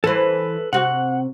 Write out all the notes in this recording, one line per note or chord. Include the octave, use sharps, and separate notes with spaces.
E3 A4 B4 C5
C3 F#4 F#5